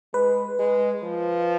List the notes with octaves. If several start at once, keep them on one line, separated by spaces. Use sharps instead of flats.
G#3 B4
G#3
F3